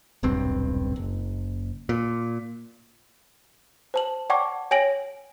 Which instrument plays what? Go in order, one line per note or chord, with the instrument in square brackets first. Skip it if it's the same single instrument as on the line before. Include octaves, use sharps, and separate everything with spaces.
[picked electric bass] D#1 B1 G2 C4
F#1
A#2
[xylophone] C5 A5 F#7
D5 F#5 G5 A5 C#6 D6
C#5 G5 G#5 A#6 D7 F#7